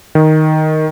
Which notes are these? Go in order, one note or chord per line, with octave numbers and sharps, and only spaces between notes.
D#3